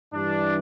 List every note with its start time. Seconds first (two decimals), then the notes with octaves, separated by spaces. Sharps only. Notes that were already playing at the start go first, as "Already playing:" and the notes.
0.13 G2 E3 G3 D4